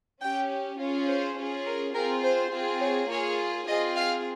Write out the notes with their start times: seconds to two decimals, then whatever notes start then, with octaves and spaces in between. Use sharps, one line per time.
0.22 C#4 G4 G5
0.79 C#4 F4 G#4
1.07 C5
1.37 C#4 F4 G#4
1.65 A#4
1.94 C4 F4 G#4 A#4
2.23 C5
2.51 C4 F4 G#4
2.80 C#5
3.09 A#3 F4 G#4 C#5
3.67 C4 F4 G#4 D#5
3.95 F5